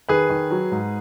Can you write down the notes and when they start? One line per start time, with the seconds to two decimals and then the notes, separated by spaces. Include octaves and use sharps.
0.08 D#3 G#4 B4
0.30 D#3
0.51 F#3
0.72 G#2